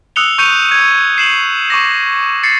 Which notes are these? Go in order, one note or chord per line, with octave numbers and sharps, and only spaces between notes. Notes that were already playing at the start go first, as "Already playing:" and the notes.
D#6 E6 F#6 C#7 F7 G7
C#6 G6 C#7 D#7 F7
G#6
C7 E7 F#7
C#6 D6 A#6
A6 C7 C#7